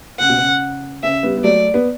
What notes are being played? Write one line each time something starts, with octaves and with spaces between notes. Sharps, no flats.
C#3 F#5
B2
C#3
C#3 E5
G3 B3
B3
F#3 A3 D5
B3